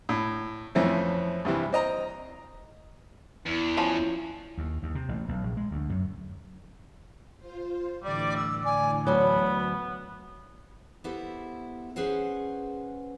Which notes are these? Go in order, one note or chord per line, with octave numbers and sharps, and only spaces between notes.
A2
F2 E3 F3 A3 C4 C#4
G2 C3 E3
C4 D#5 A#5
E2 E4
F3 C#4
D#2
D#2
C3
A1
B1
A#1
G#3
D2
F#2
F4 C5
A2 D3 E3 G3 D5
E6
D5 G#5
D2 F#3 B3 B5
B3 E4 G4 A4 C5
C#4 G#4 B4 C5 F#5